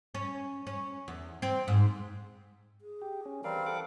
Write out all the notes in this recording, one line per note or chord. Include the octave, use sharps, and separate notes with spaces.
C#4
C#4
E2
C4
G#2
G#4
G4
C#4
E3 G3 C4 A#4 D5 F5
A4 F#5 D6